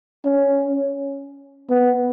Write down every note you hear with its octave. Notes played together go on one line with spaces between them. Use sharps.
C#4
B3